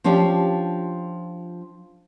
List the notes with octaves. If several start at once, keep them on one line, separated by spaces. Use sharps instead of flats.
F3 C#4 D4 F4 G4